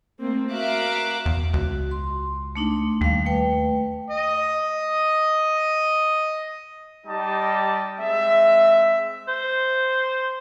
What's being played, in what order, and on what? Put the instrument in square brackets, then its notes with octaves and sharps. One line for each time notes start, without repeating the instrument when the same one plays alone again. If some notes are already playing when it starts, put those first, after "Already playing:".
[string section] A3 A#3 C4
F#4 A#4 E5 F5 D6 F#6
[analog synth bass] E2
[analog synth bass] C#2 [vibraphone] F#4
[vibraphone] C6
A3 D4 D#4
[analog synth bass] D#2 [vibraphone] G3 F5
[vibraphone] A3 B4 G5
[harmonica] D#5 D#6
[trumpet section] G3 D#4 G4 D#5 A5
G#3 C4 E5
[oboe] C5